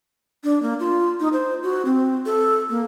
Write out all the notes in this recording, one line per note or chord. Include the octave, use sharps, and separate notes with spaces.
D4
A#3
F4
D#4
C5
F#4
C4
A4
A#3